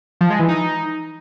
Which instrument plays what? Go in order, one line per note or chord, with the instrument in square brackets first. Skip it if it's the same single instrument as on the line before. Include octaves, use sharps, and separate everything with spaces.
[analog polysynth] F3
G#3
E3
D#4